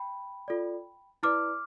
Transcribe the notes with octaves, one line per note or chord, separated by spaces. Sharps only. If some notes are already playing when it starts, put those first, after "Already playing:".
Already playing: G5 B5
F4 A4 D5
E4 B4 D5 D6 F6